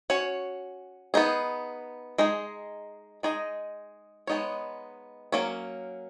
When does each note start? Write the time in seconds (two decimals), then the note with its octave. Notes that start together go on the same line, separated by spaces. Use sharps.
0.10 C#4 F#4 C#5
1.14 B3 D#4 G#4
2.18 G#3 D#4 G#4
3.23 G#3 D#4 G#4 D#5
4.27 G#3 B3 D#4 A#4 C#5
5.32 F#3 A#3 C#4